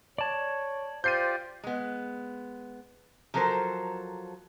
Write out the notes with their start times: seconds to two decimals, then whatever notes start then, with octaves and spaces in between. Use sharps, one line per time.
0.18 C#5 D5 A5
1.04 F4 G4 C5 D5 G6 C7 D#7
1.63 G#3 B3
3.34 F3 F#3 A4 A#4 C5